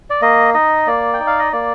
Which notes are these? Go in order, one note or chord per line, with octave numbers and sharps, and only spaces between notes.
D5
A#3 D#5
D#4 D#5
A#3 D5
G5
D#4
F5
D#5
A#3 D5